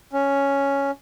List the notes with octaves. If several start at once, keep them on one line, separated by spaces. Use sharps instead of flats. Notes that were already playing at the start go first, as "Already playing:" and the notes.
C#4